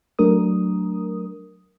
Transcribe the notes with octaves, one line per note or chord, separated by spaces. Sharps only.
F#3 A3 D4 A#4 D#6